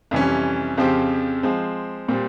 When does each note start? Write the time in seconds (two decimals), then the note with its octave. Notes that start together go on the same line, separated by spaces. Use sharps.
0.11 F2 C3 E3 G3 C#4
0.77 F2 C#3 F3 C4 G4
1.43 F3 G#3 C4
2.08 A#2 G3 C4